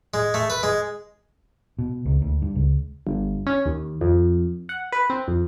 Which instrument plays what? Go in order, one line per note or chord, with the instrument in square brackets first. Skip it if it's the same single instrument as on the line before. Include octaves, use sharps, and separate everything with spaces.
[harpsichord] G#3
A3
B4
G#3
[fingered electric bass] B2
C#2
D2
G2
C#2
[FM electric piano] G1
C#4
D#2
F2
F#5
B4
C4
F2